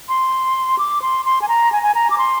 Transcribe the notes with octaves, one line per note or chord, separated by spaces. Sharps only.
C6
D6
C6
C6
G#5
A#5
G#5
G#5
A#5
D6
C6